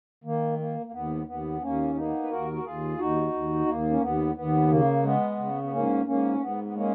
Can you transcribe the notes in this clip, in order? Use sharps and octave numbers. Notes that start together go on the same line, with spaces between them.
D#3 A#3
A#3
A#3
D#2 B3
D#2 B3
D#2 A#3 C#4
A#3 B3 D#4
B4
D#2 F#4 A#4
F#4
D#2 F4 G#4
D#2 D#4 F#4
D#2
D#2 A#3
C#4
D#2 B3
D#2 B3
C#3 A#3
G#3 B3
C#3
B3
G#2 A#3 C#4
G#2 A#3 C#4
A#3
G#2 B3
B3
G#3 A#3 C#4